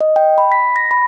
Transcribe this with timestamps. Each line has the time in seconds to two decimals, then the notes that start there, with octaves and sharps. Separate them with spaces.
0.01 D#5
0.16 G5
0.38 B5
0.52 B6
0.76 A#6
0.91 B5